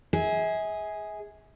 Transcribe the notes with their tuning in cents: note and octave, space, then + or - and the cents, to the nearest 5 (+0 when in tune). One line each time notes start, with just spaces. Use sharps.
G#4 +0 E5 -40